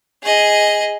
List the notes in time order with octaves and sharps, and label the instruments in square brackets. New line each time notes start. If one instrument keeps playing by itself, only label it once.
[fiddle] G#4 D#5